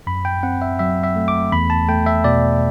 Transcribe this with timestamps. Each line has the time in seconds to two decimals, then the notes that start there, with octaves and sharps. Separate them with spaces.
0.07 F#2 B5
0.25 G5
0.43 C4 F#5
0.62 E5
0.79 F#3 E5
1.04 E5
1.16 A3
1.28 D6
1.52 E2 B5
1.70 A5
1.89 A3 G5
2.06 E5
2.24 B2 D5